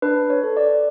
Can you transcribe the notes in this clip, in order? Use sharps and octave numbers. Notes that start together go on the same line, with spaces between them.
D4 B4
C#5
A4
D5